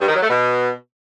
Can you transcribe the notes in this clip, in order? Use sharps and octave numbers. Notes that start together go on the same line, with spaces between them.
G2
D#3
F#3
A3
B2